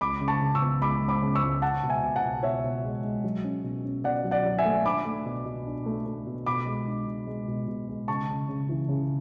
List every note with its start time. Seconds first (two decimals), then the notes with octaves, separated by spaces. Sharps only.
0.01 C#2 B5 D6
0.21 C#3
0.28 A5 C#6
0.41 C#3
0.55 C#6 E6
0.62 B3
0.82 C#2 B5 D6
1.02 C#2
1.09 B5 D6
1.22 C#3
1.35 C#6 E6
1.42 C#2
1.62 G#3 F#5 A5
1.83 B2
1.89 E5 G#5
2.03 B2
2.16 F#5 A5
2.23 B2
2.43 B2 C#5 E5
2.64 B2
2.84 G#3
3.04 G#3
3.24 F#3
3.44 C#4
3.64 B2
3.85 C#4
4.04 B2 D5 F#5
4.24 F#3
4.31 D5 F#5
4.45 F#3
4.58 E5 G#5
4.65 A3
4.85 D4 B5 D6
5.05 A3
5.26 B2
5.45 B2
5.66 D4
5.86 A3
6.06 A3
6.27 B2
6.46 B2 B5 D6
6.66 G#3
6.87 D4
7.07 B2
7.27 G#3
7.48 B2
7.68 B2
7.88 G#3
8.08 C#3 A5 C#6
8.29 C#3
8.49 C#3
8.69 E3
8.89 C#3